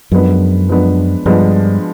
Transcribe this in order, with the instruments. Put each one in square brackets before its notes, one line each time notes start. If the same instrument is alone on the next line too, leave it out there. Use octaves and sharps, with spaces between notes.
[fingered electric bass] F#2 [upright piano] F3 G#3 B3 D4
[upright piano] F3 G#3 B3 D4
[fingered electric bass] G2 [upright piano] F3 G#3 B3 D4